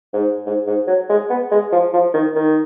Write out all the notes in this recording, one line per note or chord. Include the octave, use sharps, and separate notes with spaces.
G#2
G#2
G#2
F#3
G#3
B3
G#3
F3
F3
D#3
D#3